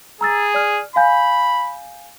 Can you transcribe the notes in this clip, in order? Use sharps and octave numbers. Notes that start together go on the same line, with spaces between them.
G#4 A#5 E6 A6
D5 F6
F5 G#5 B5 G6